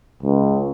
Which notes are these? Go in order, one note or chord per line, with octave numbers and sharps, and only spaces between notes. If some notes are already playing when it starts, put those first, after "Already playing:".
C#2